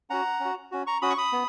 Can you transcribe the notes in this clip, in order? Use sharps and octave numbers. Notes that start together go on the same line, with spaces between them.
C#4 F#4 F#5 A#5
C#4
F#4
C#4 F#4
A#5 C#6
C#4 F#4 B5 D#6
C#6
B5 D#6
B3